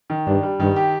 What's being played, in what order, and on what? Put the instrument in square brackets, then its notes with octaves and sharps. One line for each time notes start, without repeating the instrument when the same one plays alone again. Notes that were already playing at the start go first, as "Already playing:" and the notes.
[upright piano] D#3
[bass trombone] G2 [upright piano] D4
[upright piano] G3
[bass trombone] G2 [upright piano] D#3
[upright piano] G4